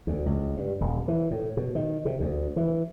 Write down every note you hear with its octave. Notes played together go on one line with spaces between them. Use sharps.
D2
C#2
G2
D#1
E3
A2
B2
D#3
C3
D2
E3